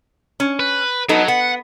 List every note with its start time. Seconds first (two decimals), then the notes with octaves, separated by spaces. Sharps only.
0.40 C#4
0.60 B4
1.09 F#3 B3 D#4 A4
1.28 B3 F#5